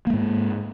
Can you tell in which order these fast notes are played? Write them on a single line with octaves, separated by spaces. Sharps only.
A#3 G#3 G#2